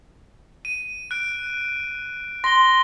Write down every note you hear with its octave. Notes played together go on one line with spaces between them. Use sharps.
D#7
F#6 D7
C6 A#6 G7